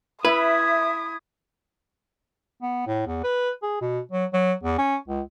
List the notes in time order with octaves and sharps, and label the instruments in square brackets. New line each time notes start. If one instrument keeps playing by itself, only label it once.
[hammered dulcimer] E4 [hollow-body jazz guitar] B4 [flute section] E5 [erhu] D#6
[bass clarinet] B3
A2
E2
B4
G#4
B2
F#3
F#3
E2
C#4
C#2